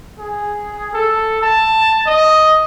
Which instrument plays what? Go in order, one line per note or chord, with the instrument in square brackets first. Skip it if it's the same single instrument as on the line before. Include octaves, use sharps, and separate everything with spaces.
[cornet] G#4
A4
A5
D#5